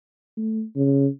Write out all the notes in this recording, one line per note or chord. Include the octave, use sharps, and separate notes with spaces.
A3
C#3